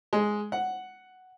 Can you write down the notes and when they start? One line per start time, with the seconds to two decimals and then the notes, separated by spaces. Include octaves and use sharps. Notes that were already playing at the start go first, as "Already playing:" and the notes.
0.13 G#3
0.52 F#5